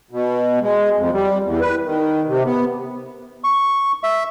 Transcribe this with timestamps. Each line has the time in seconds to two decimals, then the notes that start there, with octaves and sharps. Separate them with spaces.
0.11 B2
0.61 G#3
0.97 F2
1.12 G3
1.43 E2
1.61 B4
1.84 D#3
2.27 C3
2.45 B3
3.44 C#6
4.03 E5